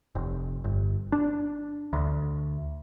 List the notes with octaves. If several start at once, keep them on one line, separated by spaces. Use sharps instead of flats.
F1
G1
D4
D2